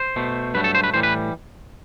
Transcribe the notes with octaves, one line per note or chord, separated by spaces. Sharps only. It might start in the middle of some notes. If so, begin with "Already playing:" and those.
Already playing: C5
B2 A3
G2 F#3 A3 B4
A4
C5
B4
A2 E3 G3 C5
B4